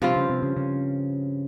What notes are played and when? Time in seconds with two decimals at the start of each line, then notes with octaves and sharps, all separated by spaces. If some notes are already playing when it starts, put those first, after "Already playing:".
0.02 G2 C3 F3 C4 F4
0.16 C#3
0.30 C3
0.43 C#3
0.56 C#3